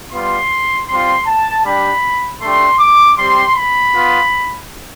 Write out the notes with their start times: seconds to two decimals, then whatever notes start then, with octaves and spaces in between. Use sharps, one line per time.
0.12 G3 B3 F4 C6
0.88 G3 C4 F4 C6
1.27 A5
1.65 G3 D4 G4 B5
2.41 A3 D4 G4 C6
2.79 D6
3.18 G3 C4 G4 C6
3.55 B5
3.93 B3 F4